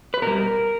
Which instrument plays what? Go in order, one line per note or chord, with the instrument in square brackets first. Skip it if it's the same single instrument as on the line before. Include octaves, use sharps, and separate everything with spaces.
[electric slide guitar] B4
B2 G3 A#4